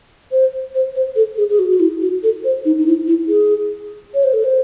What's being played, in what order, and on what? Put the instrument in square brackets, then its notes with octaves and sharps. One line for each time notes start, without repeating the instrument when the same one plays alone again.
[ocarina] C5
C5
C5
A4
G#4
G#4
F#4
F#4
E4
F#4
A4
C5
D#4
D#4
E4
E4
G#4
C#5
C5
A4
C5